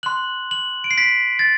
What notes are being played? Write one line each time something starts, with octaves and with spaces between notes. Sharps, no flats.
C6 F#6 F#7
F#7
D7
C7
B6
A6